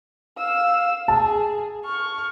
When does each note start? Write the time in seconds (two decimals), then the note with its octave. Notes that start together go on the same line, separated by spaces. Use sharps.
0.38 F5 E6
1.08 G#4 A5
1.85 C#6 F6